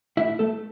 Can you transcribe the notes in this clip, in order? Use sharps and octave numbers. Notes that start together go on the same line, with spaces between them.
A2 E4 E5
A3 A4